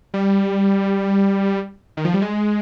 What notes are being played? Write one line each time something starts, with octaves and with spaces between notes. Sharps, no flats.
G3
D#3
F3
G3
G#3